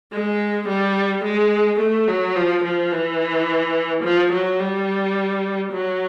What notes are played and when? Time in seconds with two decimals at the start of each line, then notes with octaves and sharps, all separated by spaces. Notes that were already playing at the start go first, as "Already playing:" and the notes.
0.12 G#3
0.68 G3
1.24 G#3
1.80 A3
2.08 F#3
2.36 F3
2.64 F3
2.92 E3
4.03 F3
4.32 F#3
4.60 G3
5.72 F#3